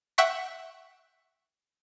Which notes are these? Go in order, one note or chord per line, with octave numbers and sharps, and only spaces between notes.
E5 F#5 G5 C#6 B6